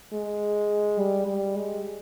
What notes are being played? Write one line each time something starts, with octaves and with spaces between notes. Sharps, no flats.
G#3
G3
G3
G#3